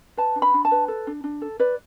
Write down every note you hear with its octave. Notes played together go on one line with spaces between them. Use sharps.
B4 A5
D4
B5
D4
A5
B4
A4
D4
D4
A4
B4 D5